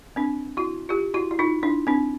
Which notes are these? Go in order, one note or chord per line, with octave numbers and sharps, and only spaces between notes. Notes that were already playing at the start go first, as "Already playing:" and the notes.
C4 D4
E4 F#4
F4 G4
E4 F#4
E4
D#4 F4
D4 E4
C4 D4